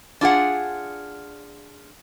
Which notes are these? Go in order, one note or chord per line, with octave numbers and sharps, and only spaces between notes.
D4 F4 G#4 F#5